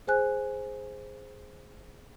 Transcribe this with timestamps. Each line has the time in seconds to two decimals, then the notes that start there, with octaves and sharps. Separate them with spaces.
0.07 G#4 C5 G#5 F#6